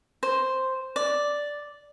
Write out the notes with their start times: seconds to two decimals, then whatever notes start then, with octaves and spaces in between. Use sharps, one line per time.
0.23 C5
0.96 D5